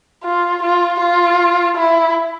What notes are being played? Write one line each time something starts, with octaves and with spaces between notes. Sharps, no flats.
F4
F4
F4
E4